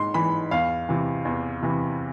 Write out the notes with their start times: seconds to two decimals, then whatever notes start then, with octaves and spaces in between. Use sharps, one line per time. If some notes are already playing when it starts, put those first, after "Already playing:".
Already playing: G#2 C6
0.14 E3 B5
0.51 E2 F5
0.89 C3 E3
1.25 E2
1.62 C3 E3